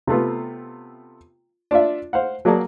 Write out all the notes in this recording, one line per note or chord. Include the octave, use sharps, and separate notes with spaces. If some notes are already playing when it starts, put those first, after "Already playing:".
C3 A3 B3 F4
D4 F4 D5 E5
C5 F5 F#5
F#3 A#3 G#4 D5 A5